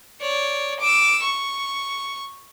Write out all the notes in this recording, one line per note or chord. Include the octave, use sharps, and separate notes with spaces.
C#5 D5
D6 E6
C#6